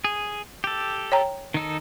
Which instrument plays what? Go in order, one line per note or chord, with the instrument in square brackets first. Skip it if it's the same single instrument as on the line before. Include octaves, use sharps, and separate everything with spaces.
[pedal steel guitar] G#4
G4 A4
[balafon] C#5 G5 A#5
[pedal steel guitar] D#3 D#4 A4